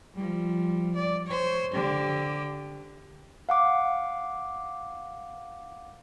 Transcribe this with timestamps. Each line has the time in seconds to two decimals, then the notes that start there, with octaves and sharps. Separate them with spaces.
0.15 F3 G3
0.95 D5
1.27 C5 C#5
1.74 D3 G4
3.49 F5 F#5 D6